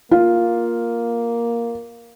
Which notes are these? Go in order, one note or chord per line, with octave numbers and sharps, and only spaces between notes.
A#3 F4